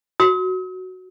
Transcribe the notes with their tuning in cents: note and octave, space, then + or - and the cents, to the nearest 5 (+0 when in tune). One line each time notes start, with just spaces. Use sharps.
F#4 +0 D#6 +45